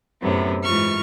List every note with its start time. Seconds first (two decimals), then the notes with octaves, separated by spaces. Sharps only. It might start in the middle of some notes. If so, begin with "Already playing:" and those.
0.21 F#2 A2 C3 B3
0.63 G#2 E3 F4 C#6 F6